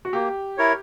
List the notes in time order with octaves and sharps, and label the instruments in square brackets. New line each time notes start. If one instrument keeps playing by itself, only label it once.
[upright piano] F#4
[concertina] A#3 [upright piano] G4
[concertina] E4 A#4 C#5